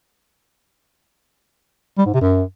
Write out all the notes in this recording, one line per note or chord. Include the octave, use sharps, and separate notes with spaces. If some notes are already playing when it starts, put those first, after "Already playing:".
G3
G#2
C3
F#2